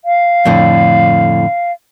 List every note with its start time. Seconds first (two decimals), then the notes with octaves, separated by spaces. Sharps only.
0.05 F5
0.45 F2 A2 D3